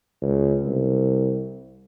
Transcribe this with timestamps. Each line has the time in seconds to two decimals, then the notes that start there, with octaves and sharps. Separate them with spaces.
0.22 C#2
0.65 C2